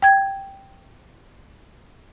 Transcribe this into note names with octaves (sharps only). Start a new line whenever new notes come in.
G5 G#6